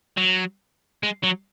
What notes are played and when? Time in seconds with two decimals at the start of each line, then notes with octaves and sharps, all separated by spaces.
0.17 F#3
1.03 G#3
1.23 F#3